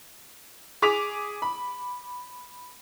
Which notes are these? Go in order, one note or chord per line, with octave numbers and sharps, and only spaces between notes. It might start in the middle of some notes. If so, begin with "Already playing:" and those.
G#4 D6 B6 F7
B5